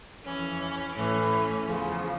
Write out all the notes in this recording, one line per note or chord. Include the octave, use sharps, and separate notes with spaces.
F2 E3 C#4
A2 E3 C#4
E2 C#3 F3